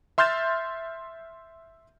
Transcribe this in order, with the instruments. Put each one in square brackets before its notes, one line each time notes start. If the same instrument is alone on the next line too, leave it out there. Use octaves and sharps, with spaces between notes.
[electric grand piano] E5 C6 F6 G6 A6 E7